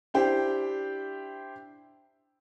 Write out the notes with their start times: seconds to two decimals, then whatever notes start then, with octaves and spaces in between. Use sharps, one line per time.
0.14 D4 E4 G4 C5 G5